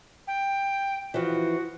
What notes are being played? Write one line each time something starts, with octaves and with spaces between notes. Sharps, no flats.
G5
E3 F3 F#4